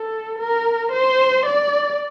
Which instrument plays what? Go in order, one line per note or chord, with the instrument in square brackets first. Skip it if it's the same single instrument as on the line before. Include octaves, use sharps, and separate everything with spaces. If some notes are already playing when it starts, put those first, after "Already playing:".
Already playing: [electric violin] A4
A#4
C5
D5